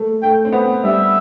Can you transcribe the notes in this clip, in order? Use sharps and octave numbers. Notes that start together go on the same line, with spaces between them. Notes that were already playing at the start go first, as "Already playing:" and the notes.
Already playing: A3
A3 G5
C4
B3
G3 E5